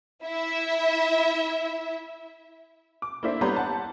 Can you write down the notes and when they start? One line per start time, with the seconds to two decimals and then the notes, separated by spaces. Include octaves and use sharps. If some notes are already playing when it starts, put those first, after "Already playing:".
0.23 E4 E5
3.02 D6
3.23 A#3 D4 E4 C5 E5
3.41 G3 B3 C#5 A#5 C6 G6
3.56 F#5 A5